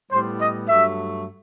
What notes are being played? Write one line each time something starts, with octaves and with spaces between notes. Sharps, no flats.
A2 G3 B3 C5
D#5
G2 F#3 A3 E5